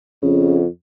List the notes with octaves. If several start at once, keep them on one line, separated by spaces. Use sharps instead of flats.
F2 C#3